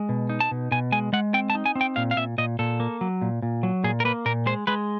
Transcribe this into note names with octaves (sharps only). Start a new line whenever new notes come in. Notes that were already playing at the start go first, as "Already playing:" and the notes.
Already playing: G#3
B2
D#4
A5
B2
B2 G#5
G#3 G#5
G#3 F#5
C4 G5
A5
D#4
G#5
C4
G5
A#2 F5
F5
A#2 E5
A#2 D#5
A#2 A4
A#3
F#3
A#2
A#2
F#3
A#2 G#4
A#4
A#3 B4
A#2 A#4
G#3 C5
G#3 B4